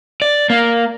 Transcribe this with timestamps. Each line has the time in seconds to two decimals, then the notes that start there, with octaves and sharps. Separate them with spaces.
0.22 D5
0.50 A#3